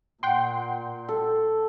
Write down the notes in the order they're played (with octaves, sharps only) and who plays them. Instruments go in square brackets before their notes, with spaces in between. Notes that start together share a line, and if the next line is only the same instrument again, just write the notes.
[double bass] A#2 [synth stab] F#5 G5 C6
[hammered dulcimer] A4